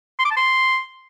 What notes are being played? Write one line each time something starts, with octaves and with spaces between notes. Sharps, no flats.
C6
D6
A5
C6